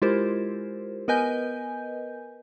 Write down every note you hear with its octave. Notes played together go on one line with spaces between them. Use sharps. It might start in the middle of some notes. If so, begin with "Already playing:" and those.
G#3 E4 F4 G4 A#4 C5
B3 A#4 B4 D#5 G#5 G6